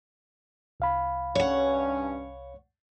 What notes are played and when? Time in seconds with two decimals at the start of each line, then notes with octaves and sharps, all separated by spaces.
0.80 C2 F5 B5
1.35 G2 C#4 C#5 F#5